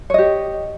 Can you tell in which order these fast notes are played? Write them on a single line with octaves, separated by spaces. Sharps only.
C#5 D#5 G4